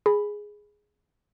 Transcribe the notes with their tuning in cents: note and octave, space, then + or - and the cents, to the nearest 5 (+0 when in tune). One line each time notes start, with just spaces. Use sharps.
G#4 +0 B5 +0